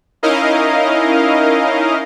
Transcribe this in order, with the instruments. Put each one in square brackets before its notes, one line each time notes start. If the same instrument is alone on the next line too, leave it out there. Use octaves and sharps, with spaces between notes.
[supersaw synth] C#4 D#4 E4 A#4 D#5 F5